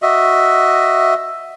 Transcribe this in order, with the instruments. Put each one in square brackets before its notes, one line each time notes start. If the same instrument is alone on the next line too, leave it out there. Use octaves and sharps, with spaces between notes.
[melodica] F#4 D#5 E5